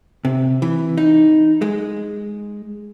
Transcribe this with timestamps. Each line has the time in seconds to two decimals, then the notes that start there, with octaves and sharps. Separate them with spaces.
0.25 C3
0.62 E3
0.98 D#4
1.62 G#3